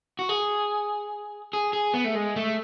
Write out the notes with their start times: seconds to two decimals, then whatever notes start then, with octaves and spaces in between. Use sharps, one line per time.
0.19 F#4
0.29 G#4
1.53 G#4
1.73 G#4
1.94 B3
2.05 A3
2.15 G#3
2.36 A3